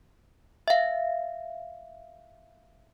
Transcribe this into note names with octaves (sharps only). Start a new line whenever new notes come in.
E5 F5